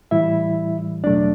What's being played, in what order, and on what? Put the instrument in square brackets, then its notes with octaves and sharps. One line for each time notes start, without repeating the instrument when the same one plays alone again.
[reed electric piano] A2 E3 G3 E4 E5
E2 B2 F#3 A3 D4 D5